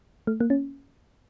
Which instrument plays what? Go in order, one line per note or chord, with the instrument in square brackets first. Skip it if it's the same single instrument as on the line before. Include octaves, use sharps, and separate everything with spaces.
[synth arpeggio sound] A3
A#3
C#4